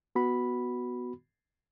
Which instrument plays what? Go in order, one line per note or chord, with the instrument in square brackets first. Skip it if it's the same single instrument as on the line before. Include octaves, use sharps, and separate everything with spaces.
[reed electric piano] B3 F#4 B5